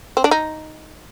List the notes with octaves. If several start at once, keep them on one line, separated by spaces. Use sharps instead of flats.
C4
D4
D#4